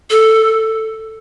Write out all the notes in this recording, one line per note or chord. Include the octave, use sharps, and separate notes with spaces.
A4